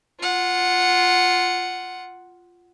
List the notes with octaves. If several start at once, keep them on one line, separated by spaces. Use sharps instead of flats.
F4 F#5